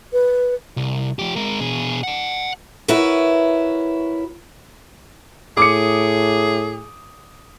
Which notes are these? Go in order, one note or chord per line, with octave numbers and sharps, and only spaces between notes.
B4
C2
F3 G4
G#3 A#4
B2 G#4
F#5 A5
E4 F#4 A#4 B4 C#5
A2 G#4 D6 D#6 C#7